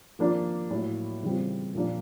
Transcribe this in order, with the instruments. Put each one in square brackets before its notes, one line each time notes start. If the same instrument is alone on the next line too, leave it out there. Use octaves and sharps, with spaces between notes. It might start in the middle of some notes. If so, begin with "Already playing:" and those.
[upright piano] F3 A#3 D4 F4
A2 F#3 A#3
C#3 E3 G3 C4 F4
A#2 F3 A#3 D4